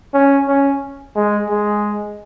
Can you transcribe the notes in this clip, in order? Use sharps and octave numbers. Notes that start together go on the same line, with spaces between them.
C#4
C#4
G#3
G#3